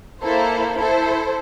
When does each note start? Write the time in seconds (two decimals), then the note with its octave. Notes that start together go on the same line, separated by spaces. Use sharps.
0.21 A#3 E4 A4 C5
0.76 E4 A4 C5